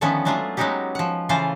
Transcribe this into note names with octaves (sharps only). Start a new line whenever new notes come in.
D3 D#3 F3 A3 B3 C#4
F#3 G#3 A3 D4 F4 G#4
F#3 G#3 B3 C#4 D#4 G4
F3 F#5
C#3 E3 A3 F4 C5 F5